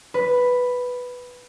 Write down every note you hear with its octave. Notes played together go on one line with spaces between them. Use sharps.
B4